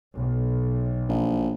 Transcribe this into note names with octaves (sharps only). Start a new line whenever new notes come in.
B1
A#1